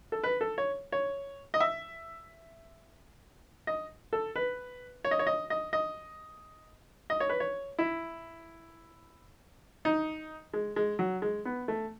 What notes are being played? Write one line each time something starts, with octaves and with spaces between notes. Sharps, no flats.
A4
B4
A4
C#5
C#5
D#5
E5
D#5
A4
B4
C#5
D#5
C#5
D#5
D#5
D#5
D#5
C#5
B4
C#5
E4
D#4
G#3
G#3
F#3
G#3
B3
A3